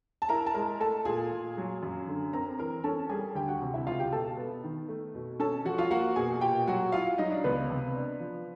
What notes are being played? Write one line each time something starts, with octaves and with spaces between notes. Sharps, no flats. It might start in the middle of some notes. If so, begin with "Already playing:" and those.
A5
E4 A#4 A#5
A5
G#3 A#4 A#5
A3 A4 A5
A#2 G#4 G#5
A#2
F#3
F#2
D3
C4 A#4 A#5
E3 A#4 A#5
C#4 A4 A5
G3 G#4 G#5
D2 G4 G5
F#4 F#5
C3
E4 E5
C#2 F4 F5
G4 G5
B2 A4 A5
B3
D#3
A3
B2
C#4 A4 A5
F3 F#4 F#5
F4 F5
A#3 F#4 F#5
B2 G#4 G#5
A#2 G4 G5
F#3 F#4 F#5
E4 F4 F5
F#3 D#4 D#5
D4 D5
C#2 B3 B4
C3
D4
F3